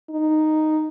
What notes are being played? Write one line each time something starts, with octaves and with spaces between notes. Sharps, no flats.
D#4